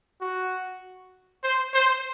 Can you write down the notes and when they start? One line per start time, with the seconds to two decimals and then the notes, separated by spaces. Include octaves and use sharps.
0.21 F#4
1.44 C5
1.74 C5